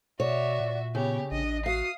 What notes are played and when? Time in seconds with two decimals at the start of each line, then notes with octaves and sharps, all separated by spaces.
0.20 B2 F#4 C#5 D5 E5
0.60 A#2
0.95 C#3 B3 G4 C#5
1.31 A1 D4 D#5
1.66 F#4 F5 D#6 C7